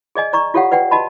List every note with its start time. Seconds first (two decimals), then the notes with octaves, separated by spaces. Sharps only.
0.15 G#4 D5 D#5 G#5
0.33 D5 A#5 C#6
0.54 F4 G4 A4 C#5 F5 F#5
0.72 B4 D5 F#5 G5
0.91 F#4 D#5 A5 B5